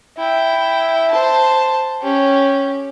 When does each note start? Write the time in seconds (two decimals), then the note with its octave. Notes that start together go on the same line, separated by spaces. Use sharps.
0.17 E4 G5
1.11 C5 A5
2.02 C#4 G4